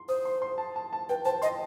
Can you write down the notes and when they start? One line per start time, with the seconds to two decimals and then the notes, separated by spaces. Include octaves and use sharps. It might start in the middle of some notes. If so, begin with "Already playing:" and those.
Already playing: C6
0.09 C5 D#6
0.25 C6
0.42 C6
0.58 A5
0.76 A5
0.93 A5
1.09 B4 G5
1.25 C5 A5
1.42 D#5 C6